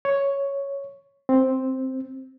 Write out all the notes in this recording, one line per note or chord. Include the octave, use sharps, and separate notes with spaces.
C#5
C4